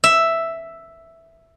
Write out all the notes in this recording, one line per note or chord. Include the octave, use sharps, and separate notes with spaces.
E5